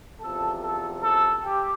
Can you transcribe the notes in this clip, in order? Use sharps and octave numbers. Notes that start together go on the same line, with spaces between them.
E2 C3 F3 A4
A4
A4
G4